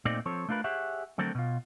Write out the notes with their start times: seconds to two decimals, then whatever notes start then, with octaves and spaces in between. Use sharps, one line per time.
0.05 A#2 A3 C4 D#4 D5
0.26 F3 C4 A4 C#5
0.49 A3 D4 F4 A#4 B4
0.64 G4 G#4 C#5 E5 F#5
1.18 D3 F#3 A3 C4 A4 A#4
1.35 B2 F4